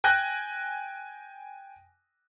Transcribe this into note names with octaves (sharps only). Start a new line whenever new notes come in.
G5 G#5 F#6 A#6